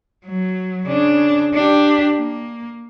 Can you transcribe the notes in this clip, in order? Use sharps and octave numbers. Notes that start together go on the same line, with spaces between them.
F#3
C#3 D4
D4 G4
A#3